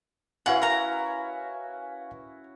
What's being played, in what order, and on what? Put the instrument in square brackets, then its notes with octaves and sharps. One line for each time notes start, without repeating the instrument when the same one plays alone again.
[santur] C#4 E4 F#4 [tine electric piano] B4 F5 G#5 [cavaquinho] F#5
[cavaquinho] A#4 A#5